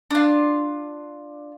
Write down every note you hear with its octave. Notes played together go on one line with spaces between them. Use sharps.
D4 F4